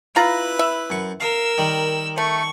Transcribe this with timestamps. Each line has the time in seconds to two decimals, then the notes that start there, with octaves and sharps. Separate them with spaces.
0.16 E4 F4 B4 A#5 F#6
0.59 E5
0.90 F#2 C#6
1.21 A#4 F5 E6
1.58 D#3 G3
2.18 A3 C#6